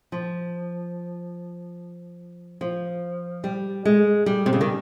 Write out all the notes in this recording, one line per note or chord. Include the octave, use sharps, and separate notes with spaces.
F3
F3
G3
G#3
G3
C3
C#3
D#3